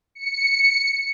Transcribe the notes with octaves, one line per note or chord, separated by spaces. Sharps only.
C#7